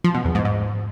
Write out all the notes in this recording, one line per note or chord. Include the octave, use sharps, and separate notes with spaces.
F3
B2
E2
G#2
G#2